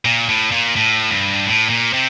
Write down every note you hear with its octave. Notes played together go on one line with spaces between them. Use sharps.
A#2
A2
A#2
A2
G2
A2
A#2
C3